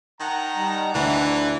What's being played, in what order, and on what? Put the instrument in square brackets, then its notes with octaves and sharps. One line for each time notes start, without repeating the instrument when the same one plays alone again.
[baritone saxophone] D#3 [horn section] F#5 A5 A#5
[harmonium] G3 D#4
[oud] D2 [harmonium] D3 [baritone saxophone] E3